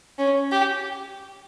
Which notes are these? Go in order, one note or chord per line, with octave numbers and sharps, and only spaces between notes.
C#4
G4